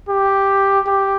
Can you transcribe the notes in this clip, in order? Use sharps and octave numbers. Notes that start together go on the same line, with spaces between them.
G4
G4